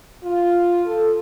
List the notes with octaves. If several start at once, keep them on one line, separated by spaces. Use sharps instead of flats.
F4
A4